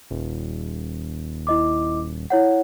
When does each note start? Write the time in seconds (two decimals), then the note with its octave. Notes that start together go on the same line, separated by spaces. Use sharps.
0.11 D#1
1.47 E4 D#5 D6
2.30 E4 C#5 F#5